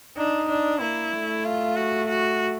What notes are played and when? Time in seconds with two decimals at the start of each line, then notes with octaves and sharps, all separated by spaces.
0.17 D4 D#4
0.49 D4
0.81 A#3 E4
1.13 A3
1.45 F4
1.76 F#4
2.09 F#4